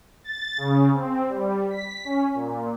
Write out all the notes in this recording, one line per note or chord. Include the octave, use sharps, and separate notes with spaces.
A6
C#3
C4
G3
B6
C#4
A#2